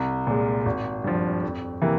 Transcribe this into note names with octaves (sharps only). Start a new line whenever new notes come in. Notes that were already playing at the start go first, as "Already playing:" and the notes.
Already playing: C2
A#2 G#3
G#1
G2 F3
F2
C3 E3 A#3